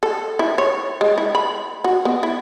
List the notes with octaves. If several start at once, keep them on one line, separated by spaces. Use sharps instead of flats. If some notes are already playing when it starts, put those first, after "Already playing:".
A4
E4
C#5
G#3
E4
B5
F#4
B3
E4